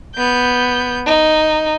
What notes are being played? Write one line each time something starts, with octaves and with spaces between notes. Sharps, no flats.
B3 G6
D#4